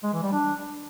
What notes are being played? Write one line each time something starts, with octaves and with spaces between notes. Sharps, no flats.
G#3
E3
G3
D4